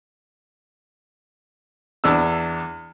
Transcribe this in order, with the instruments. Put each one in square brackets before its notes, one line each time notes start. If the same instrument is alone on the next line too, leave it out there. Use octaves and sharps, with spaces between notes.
[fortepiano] E2 D4 E6